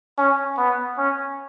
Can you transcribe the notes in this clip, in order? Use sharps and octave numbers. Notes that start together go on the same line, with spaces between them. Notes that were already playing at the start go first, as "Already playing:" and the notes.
C#4
B3
C#4